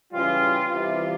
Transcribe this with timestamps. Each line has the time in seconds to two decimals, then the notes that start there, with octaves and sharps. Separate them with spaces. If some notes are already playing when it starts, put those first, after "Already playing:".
0.11 C#3 E3 G3 F4
0.70 C3 E3 G3 F4